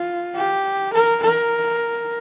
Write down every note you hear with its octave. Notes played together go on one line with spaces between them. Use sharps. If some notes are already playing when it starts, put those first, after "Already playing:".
Already playing: F4
G4
A#4
A#4